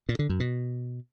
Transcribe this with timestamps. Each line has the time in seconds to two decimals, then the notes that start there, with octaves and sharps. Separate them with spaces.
0.09 A#2
0.19 D3
0.29 F#2
0.40 B2